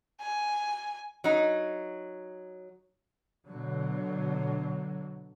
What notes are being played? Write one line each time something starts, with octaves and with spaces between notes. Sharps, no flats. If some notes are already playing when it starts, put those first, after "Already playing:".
G#5
F#3 D#4
B2 D3 F#3